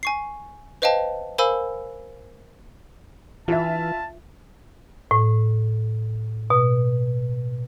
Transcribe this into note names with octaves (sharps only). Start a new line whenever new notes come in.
G#5 C#6 C7
B4 C5 D#5 F5 G5 A5
A#4 C5 F5 G#5 B5 E6
E3 F4 E5 A5
A2
B2